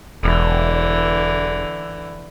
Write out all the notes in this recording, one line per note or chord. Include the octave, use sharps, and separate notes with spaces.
E1 D3 E3